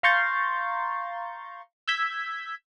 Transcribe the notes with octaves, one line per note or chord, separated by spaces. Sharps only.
F5 A#5 C6 C#6 G6 A6
E6 G6 G#6 B6